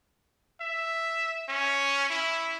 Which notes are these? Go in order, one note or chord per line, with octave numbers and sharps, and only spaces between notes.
E5
C#4
E4